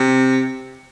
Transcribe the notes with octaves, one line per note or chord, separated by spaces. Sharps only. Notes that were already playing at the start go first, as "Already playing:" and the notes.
Already playing: C3